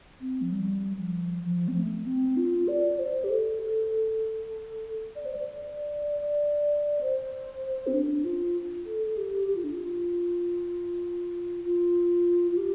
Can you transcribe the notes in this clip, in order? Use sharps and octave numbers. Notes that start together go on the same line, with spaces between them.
C4
F3
G3
F3
F3
C4
A3
C4
F4
D5
C5
G4
A4
D5
C5
D5
D5
C5
C4
D4
F4
A4
A4
G4
G4
F4
D4
F4
F4
F4
G4